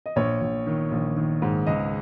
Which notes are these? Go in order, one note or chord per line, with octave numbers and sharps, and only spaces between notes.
D#5
A#1 C#5
A#1
D#3
A#1
D#3
G#2
C#2 D#5